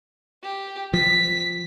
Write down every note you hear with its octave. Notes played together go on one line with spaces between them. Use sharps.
G4
F3 B6